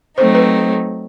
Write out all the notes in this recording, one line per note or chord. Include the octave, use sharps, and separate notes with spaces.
F#3 A3 C4 D#4 C5
B4